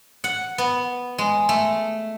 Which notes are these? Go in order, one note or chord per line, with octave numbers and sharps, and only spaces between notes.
F#5
B3
G#3
A3